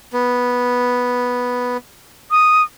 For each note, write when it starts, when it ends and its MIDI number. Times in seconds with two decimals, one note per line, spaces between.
0.13 1.77 59
2.31 2.62 87